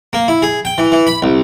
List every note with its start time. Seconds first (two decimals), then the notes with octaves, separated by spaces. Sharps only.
0.13 A#3
0.28 E4
0.42 G#4
0.65 G5
0.78 E3
0.92 E3
1.07 B5
1.22 C2